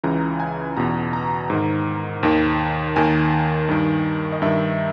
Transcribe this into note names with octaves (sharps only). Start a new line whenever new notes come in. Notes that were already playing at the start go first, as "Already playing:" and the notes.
C#2 C#3 E3 A#5
G#5
E2 B2 A#5
A#5
G#2 D#3
D#2 D#3
D#2 D#3 G#5
G2 D#3
D#5
G2 D#3 E5